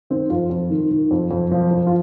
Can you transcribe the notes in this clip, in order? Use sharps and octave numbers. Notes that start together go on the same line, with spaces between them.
D#3 C4
F2 F4
F2
D#3
D#3
F2
F2
F3
F3
F4